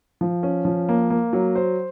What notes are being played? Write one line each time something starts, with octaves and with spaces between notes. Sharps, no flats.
F3
C#4
F3
A#3
A#3
F#3
C5